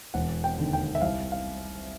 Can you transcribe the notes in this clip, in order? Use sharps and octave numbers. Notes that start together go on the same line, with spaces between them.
E1 F#5
G5
D#2 D3
G5
E5
C2 F5
F5